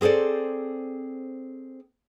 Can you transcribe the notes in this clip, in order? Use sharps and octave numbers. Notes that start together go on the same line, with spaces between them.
C4 G#4 A4 C5 D5